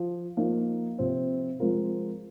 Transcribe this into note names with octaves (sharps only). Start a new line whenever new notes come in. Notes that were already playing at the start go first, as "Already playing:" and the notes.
Already playing: F3
F3 A#3 D#4
C3 F3 C4
F3 G#3 C4 F4 A#4